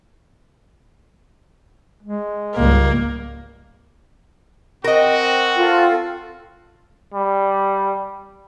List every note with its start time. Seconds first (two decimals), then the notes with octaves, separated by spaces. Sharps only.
2.03 G#3
2.55 C#2 G#2 G3 A#3
4.84 C4 F#4 A#4 D#5
5.56 F4 A4
7.14 G3